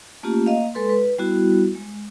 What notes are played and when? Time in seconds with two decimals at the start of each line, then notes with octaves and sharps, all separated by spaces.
0.23 A3 A#3 C#4 F4 G4
0.46 A#3 D#5 F5
0.75 G#3 A4 B4 C6
0.89 B4
1.18 G3 B3 E4 F#4
1.75 G#3